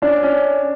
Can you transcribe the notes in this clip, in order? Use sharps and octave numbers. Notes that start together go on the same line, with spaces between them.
C#4 D4
C#4